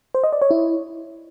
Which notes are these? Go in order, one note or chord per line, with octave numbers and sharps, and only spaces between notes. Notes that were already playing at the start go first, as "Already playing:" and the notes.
C5
D#5
D5
C#5
E4